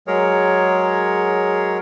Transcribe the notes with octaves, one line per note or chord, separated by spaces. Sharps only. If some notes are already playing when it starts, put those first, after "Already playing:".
F#3 G#3 G#4 A#4 C#5